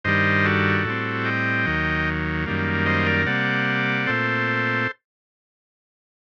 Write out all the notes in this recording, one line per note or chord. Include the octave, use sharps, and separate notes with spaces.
G2 D#3 G3 C5 D#5
F#4 A4
A2 G3 C4
D#5 G5
D#2 D#3 F#3
F#2 D#3 G3 A#3
C5 D#5
A#4 D5
C3 G3 A#3 D5 F#5
A#2 A3 C4 A4 C5